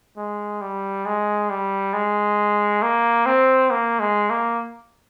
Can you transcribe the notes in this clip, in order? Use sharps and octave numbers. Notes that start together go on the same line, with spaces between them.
G#3
G3
G#3
G3
G#3
A#3
C4
A#3
G#3
A#3